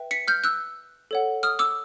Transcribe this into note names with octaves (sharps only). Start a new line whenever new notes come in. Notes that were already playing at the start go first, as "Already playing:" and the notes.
Already playing: B4 E5 G5
B6 C#7
F6 G6
E6 F#6
A4 C#5 F#5
D#6 F6
D6 E6